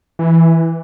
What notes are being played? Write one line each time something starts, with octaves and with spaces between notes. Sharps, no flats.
E3